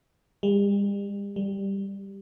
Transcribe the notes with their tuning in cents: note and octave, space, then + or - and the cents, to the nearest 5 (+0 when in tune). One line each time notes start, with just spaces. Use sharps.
G3 +40
G3 +5